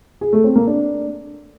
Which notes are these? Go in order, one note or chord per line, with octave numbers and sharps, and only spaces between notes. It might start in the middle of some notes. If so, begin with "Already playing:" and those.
G#4
A3
C4
A#3
D4